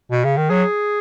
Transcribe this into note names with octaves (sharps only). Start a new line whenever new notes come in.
B2
C#3
D#3
F#3 G#4